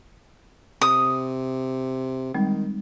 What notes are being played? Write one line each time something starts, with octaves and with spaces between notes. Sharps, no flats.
C3 D#6
D#3 G3 G#3 C4